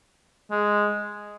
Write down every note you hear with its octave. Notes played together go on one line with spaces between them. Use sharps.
G#3